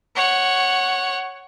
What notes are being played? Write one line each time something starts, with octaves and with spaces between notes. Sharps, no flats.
C#5 F#5